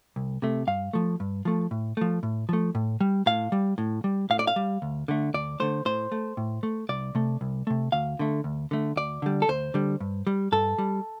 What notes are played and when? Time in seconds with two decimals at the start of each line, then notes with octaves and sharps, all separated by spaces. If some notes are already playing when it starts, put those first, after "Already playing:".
0.16 C2
0.42 C3 A3
0.67 G2 F5
0.93 F3 A3
1.20 G2
1.45 F3 A3
1.71 A2
1.97 F3 A3
2.23 A2
2.49 F3 A3
2.75 A2
3.01 G3
3.26 A2 F5
3.52 G3
3.78 A2
4.04 G3
4.30 A2 F5
4.39 D5
4.47 F5
4.56 G3
4.82 D2
5.08 D3 A3
5.34 D2 D5
5.60 D3 A3 C5
5.85 A2 C5
6.12 A3
6.37 A2
6.63 A3
6.89 C2 D5
7.15 C3 A3
7.41 C2
7.67 C3 A3
7.92 D2 F5
8.19 D3 A3
8.44 D2
8.71 D3 A3
8.96 D2 D5
9.22 D3 G3
9.42 A4
9.48 D2 C5
9.74 D3 G3
10.00 G2
10.27 G3
10.52 G2 A4
10.79 G3